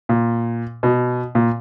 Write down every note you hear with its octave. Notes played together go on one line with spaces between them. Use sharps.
A#2
B2
A#2